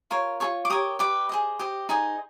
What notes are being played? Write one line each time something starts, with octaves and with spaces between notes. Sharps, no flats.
F4 A#4 C#5 C6
F4 A4 C#5 C#6
D6
G4 A#4 C#5 D#6
G4 B4 D5 D6
G#4 C5 D#5
G4 C5 D#5
D#4 G#4 C5 D#5